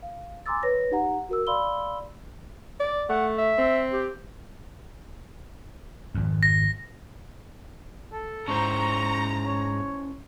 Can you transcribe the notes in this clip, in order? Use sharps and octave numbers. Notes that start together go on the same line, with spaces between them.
F5
G#5 A#5 C6 D6 E6 A6
B4 C#5 A#6
D#4 G4 F#5 A#5
F#4 A#4 E6
D5 F5 B5 C6 E6 G7
D5
A3 F#5
E5
C4
G4
G#1 F2
A#6
A4
G#2 C#4 E4 C5 A#5 C#6
C#5